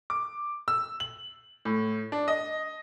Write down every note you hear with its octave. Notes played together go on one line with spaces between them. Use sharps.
D6
E6
F#7
A2
D4
D#5